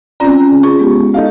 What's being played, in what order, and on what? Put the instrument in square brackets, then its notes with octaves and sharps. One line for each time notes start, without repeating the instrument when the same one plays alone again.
[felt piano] C4 A#5 [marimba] C#4 F4 D5
[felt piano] C#3
[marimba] F4 G#4 [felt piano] C#6
[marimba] G#3 B3 G4
[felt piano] D#4 A4 F5